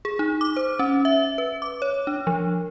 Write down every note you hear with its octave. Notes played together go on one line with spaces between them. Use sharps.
G#4
D#4
D6
C5
C#4
E5
B4
D6
C#5
D4
F3